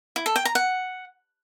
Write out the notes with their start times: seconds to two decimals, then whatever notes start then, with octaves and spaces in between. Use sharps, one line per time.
0.16 E4
0.26 A4
0.36 G5
0.45 A#5
0.55 F#5